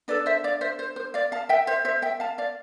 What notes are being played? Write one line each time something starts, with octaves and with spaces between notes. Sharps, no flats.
D4 A4 B4 D5
C5 E5
D5 F5
C5 E5
C5
C5
D5 F5
F5 A5
E5 G5
C5 E5
C5 E5
E5 G5
F5 A5
D5 F5